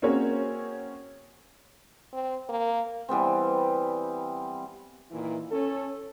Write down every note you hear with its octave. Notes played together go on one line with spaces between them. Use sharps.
A#3 C4 C#4 F#4 G#4 C#5
C4
A#3
E3 G3 B3 C4
A#2 D#3 E3 E4
C#4 A4